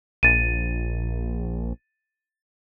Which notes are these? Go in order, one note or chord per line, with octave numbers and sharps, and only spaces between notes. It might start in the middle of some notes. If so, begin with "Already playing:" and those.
A#1 A6 D#7